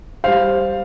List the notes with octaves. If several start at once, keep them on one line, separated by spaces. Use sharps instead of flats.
G3 C5 F5